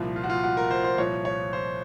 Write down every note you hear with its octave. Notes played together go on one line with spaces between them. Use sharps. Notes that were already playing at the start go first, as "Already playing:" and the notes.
Already playing: C2 A#2 F3
F4
F#4
F4
F#4
A#4
C5
C5
C2 A#2 F3 C#5
C#5
C5